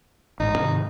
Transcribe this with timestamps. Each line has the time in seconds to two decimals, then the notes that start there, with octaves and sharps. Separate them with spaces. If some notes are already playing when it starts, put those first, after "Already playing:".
0.40 A1 G#2 D#4
0.58 G#2 C3 D#3